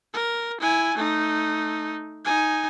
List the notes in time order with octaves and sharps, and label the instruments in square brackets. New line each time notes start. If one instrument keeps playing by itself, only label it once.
[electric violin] A#4
E4 G#5
A3 D#4
D#4 G#5